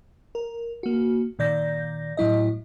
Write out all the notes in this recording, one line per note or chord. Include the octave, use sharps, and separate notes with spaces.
A#4
A#3 F#4
A#2 D#3 D5 G6 A#6
A2 F#3 E4 D#5